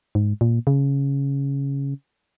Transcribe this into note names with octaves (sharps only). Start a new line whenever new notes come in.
G#2
A#2
C#3